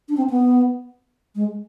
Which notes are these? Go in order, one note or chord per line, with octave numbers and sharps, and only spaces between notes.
D4
C4
B3
G#3